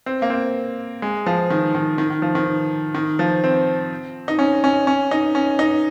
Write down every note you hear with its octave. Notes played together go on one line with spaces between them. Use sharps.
C4
A#3
C4
G#3
F3
D#3
D#3
D#3
D#3
F3
D#3
D#3
F3
C4
D#4
C#4
C#4
C#4
D#4
C#4
D#4